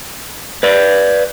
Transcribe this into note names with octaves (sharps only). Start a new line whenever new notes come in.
B4 D5